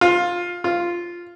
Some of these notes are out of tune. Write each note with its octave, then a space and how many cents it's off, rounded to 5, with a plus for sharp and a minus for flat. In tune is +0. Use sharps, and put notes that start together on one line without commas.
F4 +10
F4 -5